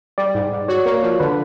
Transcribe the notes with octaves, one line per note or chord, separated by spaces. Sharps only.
G3 D5
G#2
G#2
F#4 C#5
A#3
F3
D3 B4